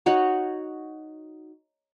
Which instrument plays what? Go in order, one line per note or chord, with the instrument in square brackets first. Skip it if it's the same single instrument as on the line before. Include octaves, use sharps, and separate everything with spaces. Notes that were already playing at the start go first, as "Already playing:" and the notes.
[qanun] D#4 F#4 C#5 F#5